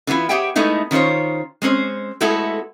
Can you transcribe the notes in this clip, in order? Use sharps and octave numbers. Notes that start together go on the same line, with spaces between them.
D3 E3 B3 E4 F4
G4 G#4 C#5 E5 F#5 G5
G#3 A3 B3 D#4 E4
D#3 C#4 F4 C5 C#5
G#3 C4 C#4 C5
G#3 A3 B3 E4 F#4 A4